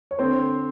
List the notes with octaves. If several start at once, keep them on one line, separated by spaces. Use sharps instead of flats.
C#5
D3 C4 C5